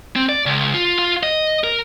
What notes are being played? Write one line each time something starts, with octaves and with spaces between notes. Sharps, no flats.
C4
D5
C#2
F4
F4
D#5
A#4